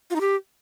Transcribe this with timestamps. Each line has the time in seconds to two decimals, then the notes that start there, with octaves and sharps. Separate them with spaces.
0.10 F4
0.16 D#4
0.21 G4